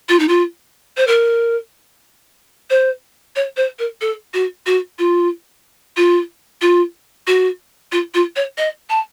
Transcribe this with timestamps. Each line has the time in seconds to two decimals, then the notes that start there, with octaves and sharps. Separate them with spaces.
0.08 F4
0.19 D#4
0.28 F4
0.97 C5
1.07 A#4
2.70 C5
3.35 C#5
3.56 C5
3.78 A#4
4.01 A4
4.33 F#4
4.66 F#4
4.98 F4
5.96 F4
6.61 F4
7.27 F#4
7.91 F4
8.14 F4
8.36 C#5
8.57 D#5
8.89 A5